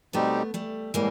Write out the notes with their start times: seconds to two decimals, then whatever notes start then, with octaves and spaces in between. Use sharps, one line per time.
0.13 B2 G3 A3 B3 C4 D#4 G4
0.54 G3 A3
0.94 A2 E3 G3 G#3 A#3